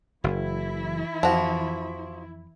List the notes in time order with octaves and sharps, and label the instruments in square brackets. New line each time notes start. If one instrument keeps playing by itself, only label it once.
[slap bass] F#1 [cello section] E3 E4
[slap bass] F2 [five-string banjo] F3 F#4